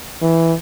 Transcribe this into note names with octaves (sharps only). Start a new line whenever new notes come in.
E3